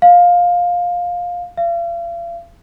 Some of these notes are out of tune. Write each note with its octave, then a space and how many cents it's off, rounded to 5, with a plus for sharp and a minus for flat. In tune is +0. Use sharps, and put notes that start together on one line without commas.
F5 +15
F5 -40